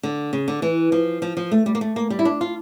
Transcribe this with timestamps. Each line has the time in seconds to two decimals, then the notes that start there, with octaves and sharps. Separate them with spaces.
0.03 D3
0.33 C#3
0.48 D3
0.62 E3
0.92 F3
1.22 F3
1.37 F3
1.51 A3
1.66 G3
1.75 A#3
1.81 A3
1.96 A#3
2.10 G3
2.19 E4
2.25 D4
2.41 F4